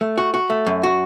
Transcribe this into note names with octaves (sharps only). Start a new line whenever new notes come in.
A3
F#4
F#4
A3
F#2
F#4